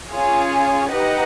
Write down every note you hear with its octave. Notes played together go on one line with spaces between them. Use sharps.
C#4 F4 G#4 C#5
D#4 G4 B4 D#5 F#5